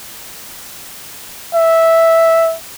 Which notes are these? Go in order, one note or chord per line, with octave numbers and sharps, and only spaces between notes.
E5